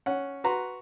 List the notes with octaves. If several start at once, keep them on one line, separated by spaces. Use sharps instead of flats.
C#4 F#5
F#4 B4 A#5 C6